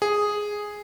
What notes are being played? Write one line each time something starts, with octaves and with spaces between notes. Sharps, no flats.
G#4